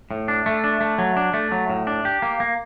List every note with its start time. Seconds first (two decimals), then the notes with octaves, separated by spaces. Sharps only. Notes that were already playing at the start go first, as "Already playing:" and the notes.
0.11 A2
0.28 D4
0.46 A3
0.64 D4
0.81 A3
0.98 F#3
1.17 D4
1.34 A3
1.52 F#3
1.70 A2
1.87 D4
2.05 G4
2.22 A#3
2.40 A#3